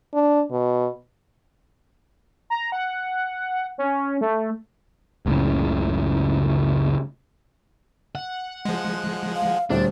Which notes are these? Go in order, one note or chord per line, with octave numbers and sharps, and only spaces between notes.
D4
B2
A#5
F#5
C#4
A3
F#1 C#2 A2 C#3
F#5
F3 G#3
F5
D#1 D2 D4 C5